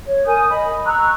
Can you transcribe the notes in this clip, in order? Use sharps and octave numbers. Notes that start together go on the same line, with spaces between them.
C#5
A#4 G#5 D#6 G6
D#5 B5
A#5 C#6 E6 F#6